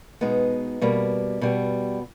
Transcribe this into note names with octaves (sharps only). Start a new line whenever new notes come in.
B2 G#3 B3 D#4
B2 G3 A#3
B2 G3 B3